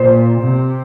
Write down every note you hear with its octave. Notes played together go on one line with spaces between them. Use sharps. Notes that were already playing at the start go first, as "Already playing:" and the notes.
Already playing: A#2 C5
C3